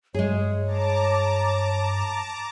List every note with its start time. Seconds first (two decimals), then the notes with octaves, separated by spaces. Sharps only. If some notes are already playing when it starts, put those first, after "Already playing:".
0.14 G2 G#3 G#4 C#5
0.66 A5 A#5 D6